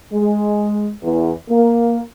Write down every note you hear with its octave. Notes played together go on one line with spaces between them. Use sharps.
G#3
E2
A#3